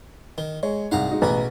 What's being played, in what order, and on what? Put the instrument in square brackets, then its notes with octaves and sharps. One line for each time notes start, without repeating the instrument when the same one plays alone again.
[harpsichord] D#3 [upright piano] G7
[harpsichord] G#3 [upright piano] C#5
[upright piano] C2 G#2 [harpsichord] F5 F#5 A#5
[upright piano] G#3 D#4 F#4
[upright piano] A1 B4 A#5 [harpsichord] B2 A3 G#4